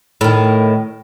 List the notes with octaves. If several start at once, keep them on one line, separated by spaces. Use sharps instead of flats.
A2 D#3